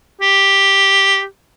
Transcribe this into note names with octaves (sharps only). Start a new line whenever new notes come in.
G4